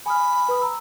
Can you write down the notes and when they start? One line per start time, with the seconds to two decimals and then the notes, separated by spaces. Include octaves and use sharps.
0.06 G#5 B5 D#6 F6
0.49 B4 D#6
0.61 A#5 E6